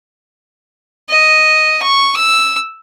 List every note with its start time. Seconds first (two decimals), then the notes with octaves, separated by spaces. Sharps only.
1.09 D#5
1.82 C#6
2.16 E6